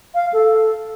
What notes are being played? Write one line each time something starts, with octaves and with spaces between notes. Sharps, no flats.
F5
A4